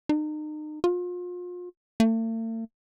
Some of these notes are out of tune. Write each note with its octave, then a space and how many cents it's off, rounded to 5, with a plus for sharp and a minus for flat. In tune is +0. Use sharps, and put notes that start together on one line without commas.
D#4 -35
F4 +35
A3 +45